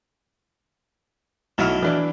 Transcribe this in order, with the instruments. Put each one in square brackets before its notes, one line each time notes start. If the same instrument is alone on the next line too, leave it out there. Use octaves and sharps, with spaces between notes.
[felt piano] B1 E4 F6 [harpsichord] D#3 F#3 A3
[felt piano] E3 D4 E4